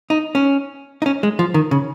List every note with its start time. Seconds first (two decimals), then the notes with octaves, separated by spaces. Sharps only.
0.10 D#4
0.35 C#4
1.02 D#4
1.06 C#4
1.23 G#3
1.39 F3
1.54 D#3
1.71 C#3